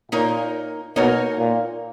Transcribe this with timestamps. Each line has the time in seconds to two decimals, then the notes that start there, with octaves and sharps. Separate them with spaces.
0.12 A#2 A#3 D#4 A#4 C#5
0.96 B2 A#3 D#4 A#4 C#5
1.39 A#2